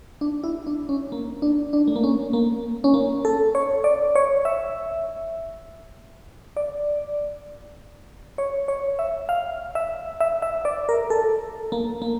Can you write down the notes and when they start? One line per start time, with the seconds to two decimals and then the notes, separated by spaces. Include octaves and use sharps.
0.21 D4
0.44 E4
0.67 D4
0.89 C#4
1.12 A#3
1.42 D4
1.73 D4
1.87 A3
1.96 A#3
2.04 C#4
2.33 A#3
2.84 C#4
2.94 A#3
3.25 A4
3.55 C#5
3.84 D5
4.15 C#5
4.45 E5
6.57 D5
8.38 C#5
8.68 C#5
8.99 E5
9.29 F5
9.75 E5
10.20 E5
10.42 E5
10.65 D5
10.89 A#4
11.10 A4
11.72 A#3
12.02 A#3